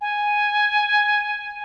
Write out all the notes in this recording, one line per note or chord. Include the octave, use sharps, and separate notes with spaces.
G#5